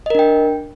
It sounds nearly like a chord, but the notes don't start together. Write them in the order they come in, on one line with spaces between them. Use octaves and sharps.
D#5 A#4 D4 G5